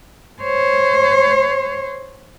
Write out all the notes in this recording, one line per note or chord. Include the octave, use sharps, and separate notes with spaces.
C5 C#5